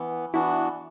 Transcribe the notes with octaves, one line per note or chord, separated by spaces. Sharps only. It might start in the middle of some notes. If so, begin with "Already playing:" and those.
Already playing: E3 B3
E3 B3 D4 E4 F#4